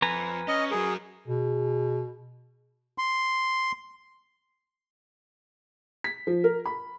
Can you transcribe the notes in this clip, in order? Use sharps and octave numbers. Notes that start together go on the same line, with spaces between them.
F2 B4 G#5 A#5
C#4 D#5
F#3 G#4 A#4
B2 G#4
C6
B6
F3
A#4
B5